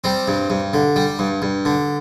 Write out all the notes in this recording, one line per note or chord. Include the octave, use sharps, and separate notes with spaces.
G3 C4
G2
G2
D3
G3
G2
G2
D3